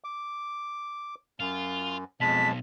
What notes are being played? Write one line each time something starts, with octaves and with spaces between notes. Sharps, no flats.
D6
F#2 F4
B1 F2 G#3 A5 B6